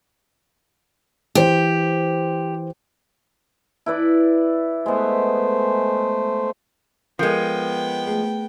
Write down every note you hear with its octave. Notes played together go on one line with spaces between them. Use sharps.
E3 G4 C5
E4 B4 D5
G#3 A3 B3 C5
F3 G#3 B3 A4 A#4 G5 G6
A3 G#4